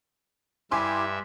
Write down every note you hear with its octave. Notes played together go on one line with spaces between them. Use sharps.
G2 E4 G4 E5 G#5 C6 D6